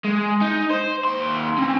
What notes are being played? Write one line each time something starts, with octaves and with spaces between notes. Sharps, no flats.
G#3
D#4
C5
D#2 C6
C4 C#4